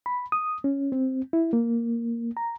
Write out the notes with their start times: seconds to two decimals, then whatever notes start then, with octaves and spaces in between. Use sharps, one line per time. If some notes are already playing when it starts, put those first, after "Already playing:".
0.06 B5
0.32 D#6
0.64 C#4
0.92 C4
1.33 E4
1.53 A#3
2.37 A#5